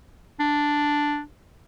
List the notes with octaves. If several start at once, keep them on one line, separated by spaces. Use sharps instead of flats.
D4